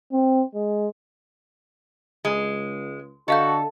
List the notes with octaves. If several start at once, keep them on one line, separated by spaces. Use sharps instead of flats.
C4
G#3
C#2 G#3
D3 F#4 A4 D#5 F5 G6